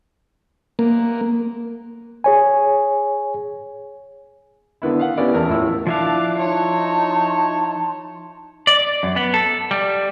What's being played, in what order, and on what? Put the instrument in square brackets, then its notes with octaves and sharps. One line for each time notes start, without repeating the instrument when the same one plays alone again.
[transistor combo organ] A#3
[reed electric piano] G#4 C#5 G#5
[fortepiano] D3 D#3 B3 E4
F5 F#5
B3 C#4 E4 G4 D5
A1 E2 A#4
A2 F3 E4 E6
[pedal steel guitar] F3 E4 F5 [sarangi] D4 [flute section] D6 F#6
[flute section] D#4 A5 C6 [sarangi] C#5
[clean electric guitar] D5
F#2
B3
A4
G3